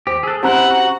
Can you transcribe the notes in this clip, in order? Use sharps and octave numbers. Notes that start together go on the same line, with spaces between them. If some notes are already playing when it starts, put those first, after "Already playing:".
D#2 G4 C5
G#4 A4 E6 F#6
C4 C#4 E4 G4 C5 F#5 A#5 F#6
F#4